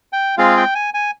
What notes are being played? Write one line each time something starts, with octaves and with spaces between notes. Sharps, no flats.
G5
G#3 C4 F4 G#4 F5
G5
G#5
G#5